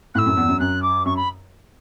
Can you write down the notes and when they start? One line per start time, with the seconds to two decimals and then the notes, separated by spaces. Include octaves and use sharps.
0.15 A2 E6 F#6
0.26 F#2
0.37 E2
0.48 F#2
0.60 F#2 F#6
0.82 D6
1.05 F#2 C#6
1.16 B5